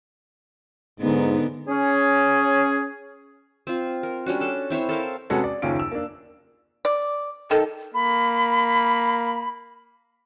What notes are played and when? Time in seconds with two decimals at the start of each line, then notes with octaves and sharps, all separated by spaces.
1.00 G#2 D3 B3 D#4
1.68 C#4 G#4
3.67 C4 F4
4.03 A#4
4.26 G3 C#4 D4 F#4
4.41 A4
4.70 C4 E4 C5 C#5
4.89 A4 A#4 C5 F5
5.30 C3 G#3 C#4 F#4 A4 B4
5.44 D5
5.62 F#1 D#2 C#4 F4 D7
5.80 E6
5.92 A#3 D4
6.85 D5
7.51 D#3 A4
7.94 A#3 B5